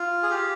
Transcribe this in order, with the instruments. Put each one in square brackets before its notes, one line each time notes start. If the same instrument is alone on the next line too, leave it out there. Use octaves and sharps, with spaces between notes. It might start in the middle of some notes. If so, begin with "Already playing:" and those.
Already playing: [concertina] F4
G#4
G4